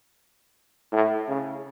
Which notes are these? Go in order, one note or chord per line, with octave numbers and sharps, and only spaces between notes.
A2
C#3